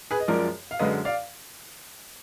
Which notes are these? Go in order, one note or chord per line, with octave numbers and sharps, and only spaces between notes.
G#4 B4
D#5
F#2 F3 G#3 A#4 D5
F5
F#2 D3 G#3 B4 D#5
D5 F5